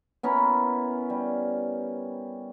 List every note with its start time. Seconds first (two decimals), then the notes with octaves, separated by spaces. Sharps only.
0.23 B3 C#4 E4 A#4
1.10 G3